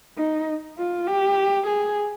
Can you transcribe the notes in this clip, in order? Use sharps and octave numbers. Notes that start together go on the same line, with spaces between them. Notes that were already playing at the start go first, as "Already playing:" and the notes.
D#4
F4
G4
G#4